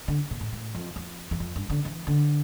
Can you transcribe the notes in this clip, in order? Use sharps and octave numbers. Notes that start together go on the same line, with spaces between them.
D3
A#2
A2
A2
F2
F2
E2
F2
G2
D3
E3
D3